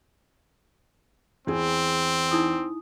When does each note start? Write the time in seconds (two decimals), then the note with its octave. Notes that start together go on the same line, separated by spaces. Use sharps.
1.47 E2 E3 C4 G#4
2.31 D#4 E4 D#6